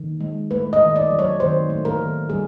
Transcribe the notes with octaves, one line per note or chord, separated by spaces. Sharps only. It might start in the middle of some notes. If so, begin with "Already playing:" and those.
Already playing: D#3
G#3
A3 B4
D#5
D#3
D5
F#3
C#5
D#3 C5
A3
A#4
D#3
G3 G#4